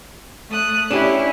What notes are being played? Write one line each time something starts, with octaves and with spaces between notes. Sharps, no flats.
A3 D#6 F#6
C#4 D4 E4 G4